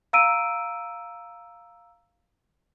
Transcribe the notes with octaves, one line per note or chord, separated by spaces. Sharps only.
F5 A#5 E6 D7 D#7